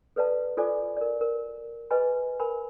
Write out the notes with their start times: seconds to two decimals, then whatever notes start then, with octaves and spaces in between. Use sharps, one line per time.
0.16 A4 B4 D5 F5 A5
0.57 F4 A4 C5 D5 G#5 D6
0.97 A#4 D5
1.21 A#4
1.90 G#4 B4 D#5 G#5 B5
2.40 A#4 G#5 B5